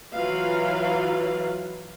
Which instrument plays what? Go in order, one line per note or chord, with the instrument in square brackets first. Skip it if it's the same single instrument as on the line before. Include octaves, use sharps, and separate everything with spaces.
[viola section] E3 F#3 F4 B4 F5